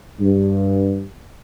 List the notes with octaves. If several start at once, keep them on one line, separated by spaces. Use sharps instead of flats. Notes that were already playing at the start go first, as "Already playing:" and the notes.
G2